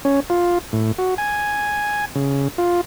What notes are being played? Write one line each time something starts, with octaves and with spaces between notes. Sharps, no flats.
C#4
F4
A2
F#4
G#5
C#3
F4